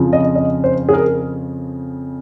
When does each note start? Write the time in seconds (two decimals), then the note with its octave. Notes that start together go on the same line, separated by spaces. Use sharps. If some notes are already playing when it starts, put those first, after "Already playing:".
Already playing: F2 C#3 F3
0.13 D#5
0.35 D#5
0.64 C5
0.89 G#4
0.93 A#4